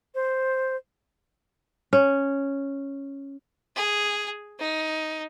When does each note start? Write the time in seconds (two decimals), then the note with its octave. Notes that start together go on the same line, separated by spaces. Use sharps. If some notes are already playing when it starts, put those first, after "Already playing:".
0.15 C5
1.93 C#4
3.76 G#4
4.59 D#4